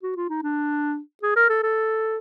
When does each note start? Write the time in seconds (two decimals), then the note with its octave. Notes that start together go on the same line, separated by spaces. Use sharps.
0.03 F#4
0.17 F4
0.30 D#4
0.43 D4
1.23 G#4
1.36 A#4
1.49 A4
1.63 A4